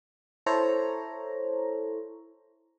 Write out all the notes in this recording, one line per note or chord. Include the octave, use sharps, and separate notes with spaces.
E4 A4 C5 C#5 A#5